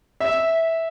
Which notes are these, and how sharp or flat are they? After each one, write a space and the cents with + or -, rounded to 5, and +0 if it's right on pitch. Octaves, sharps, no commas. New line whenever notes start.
E5 -10